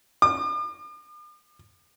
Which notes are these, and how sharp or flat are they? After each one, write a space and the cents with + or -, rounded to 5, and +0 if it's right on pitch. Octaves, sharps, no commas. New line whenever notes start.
D6 +45